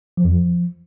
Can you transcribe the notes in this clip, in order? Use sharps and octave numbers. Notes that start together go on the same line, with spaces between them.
F3
F2
F3